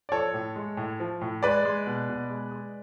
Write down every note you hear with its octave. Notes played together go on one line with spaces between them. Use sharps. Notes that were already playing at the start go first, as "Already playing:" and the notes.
D5
F3 A4 C#5
A2
G#3
A2
F3
A2
G#3 B4 D5
G#3
B2
B2
G#3
G#3